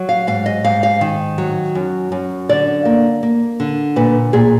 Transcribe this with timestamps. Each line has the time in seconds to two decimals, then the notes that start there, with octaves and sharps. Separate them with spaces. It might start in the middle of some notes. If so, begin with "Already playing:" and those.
Already playing: F#3
0.09 F5
0.27 G#2 F5
0.46 D#5
0.64 G#2 F5
0.83 F5
1.01 D#3
1.38 F#3
1.75 F#2
2.12 F#2
2.49 D3 D5
2.85 A#3
3.23 A#3
3.60 D3
3.96 A#2 B4
4.33 A#2 G#4